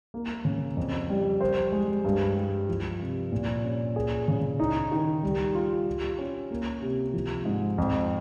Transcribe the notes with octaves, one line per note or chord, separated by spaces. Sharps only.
A#3
C#3
F2
G3
C5
G#3
G2
G3
F3
C3
A#2
C#4
G#4
C#3
D#4
D#3
G3
F4
G4
C#4
A#3
C3
F3
G#2
F2